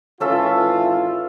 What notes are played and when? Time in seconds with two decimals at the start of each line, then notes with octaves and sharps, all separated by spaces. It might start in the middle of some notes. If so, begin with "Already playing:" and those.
0.20 G#1 E3 C#4 F4 A4 E5